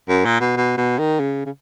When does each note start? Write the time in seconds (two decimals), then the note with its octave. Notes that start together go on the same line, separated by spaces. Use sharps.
0.09 F#2
0.25 A#2
0.40 B2
0.57 B2
0.77 B2
0.98 D#3
1.20 C#3
1.45 C#3